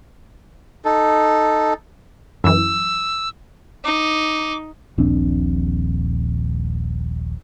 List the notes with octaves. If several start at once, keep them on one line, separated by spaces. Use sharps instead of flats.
D#4 A4
F#2 E3 E6
D#4 D6
D#1 A#1 C4 D4